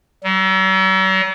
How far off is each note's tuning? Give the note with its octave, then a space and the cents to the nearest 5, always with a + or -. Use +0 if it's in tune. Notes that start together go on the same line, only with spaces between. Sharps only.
F#3 +45